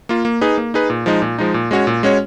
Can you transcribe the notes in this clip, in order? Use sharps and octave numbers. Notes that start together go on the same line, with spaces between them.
A#3 F4
A#3
D#4 G#4 B4
A#3
D#4 G#4 B4
A#2
F3 G#3 D#4
A#2
F3 G#3 D#4
A#2
G#3 C#4 F#4 C#5
A#2
G#3 C#4 F#4 C#5